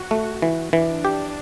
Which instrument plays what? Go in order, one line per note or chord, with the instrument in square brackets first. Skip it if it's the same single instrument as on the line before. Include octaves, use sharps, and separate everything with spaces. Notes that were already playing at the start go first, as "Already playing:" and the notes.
Already playing: [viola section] F#4
[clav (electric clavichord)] A3
E3
[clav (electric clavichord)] E3 [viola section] D4
[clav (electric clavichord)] G4